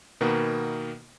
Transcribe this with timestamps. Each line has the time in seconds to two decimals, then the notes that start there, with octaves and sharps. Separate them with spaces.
0.21 B2 D#3 A#3 B3